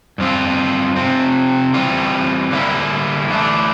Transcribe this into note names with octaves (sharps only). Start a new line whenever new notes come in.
G2 F3 C4 F4
C3 F3 C4
E3 G3 C4 F4
D3 G3 A#3 E4
E3 A3 D4